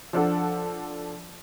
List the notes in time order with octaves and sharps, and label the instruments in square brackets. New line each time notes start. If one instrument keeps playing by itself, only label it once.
[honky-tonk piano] F3 D4 A4 F#5